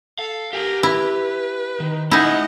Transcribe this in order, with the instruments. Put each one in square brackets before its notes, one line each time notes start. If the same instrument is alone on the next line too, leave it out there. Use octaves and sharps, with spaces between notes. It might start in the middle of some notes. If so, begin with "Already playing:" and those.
[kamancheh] A4 [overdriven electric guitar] F5
[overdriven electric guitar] G4 G#5 [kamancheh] A#4
[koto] E4 [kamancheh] B4
[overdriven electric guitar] D#3
[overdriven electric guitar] A3 G#5 [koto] D#4 E4 [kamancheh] D#5 F#5